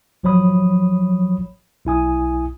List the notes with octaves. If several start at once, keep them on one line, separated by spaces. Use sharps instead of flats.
G#1 F3 F#3 C#5 B5 D#6
B1 E4 G#5 D#6